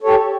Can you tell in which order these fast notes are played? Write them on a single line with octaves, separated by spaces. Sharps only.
A4 C#5 G4